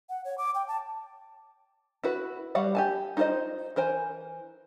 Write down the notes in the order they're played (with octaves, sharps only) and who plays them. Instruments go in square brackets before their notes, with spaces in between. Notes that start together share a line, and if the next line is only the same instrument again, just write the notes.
[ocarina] F#5
C#5
D6
G5
A5
[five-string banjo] E4 F#4 B4
G3 F#4 F5 F#5 B5
G4 G#5 A5
D#4 F4 A4 C5 D#5
E3 A#4 C5 G#5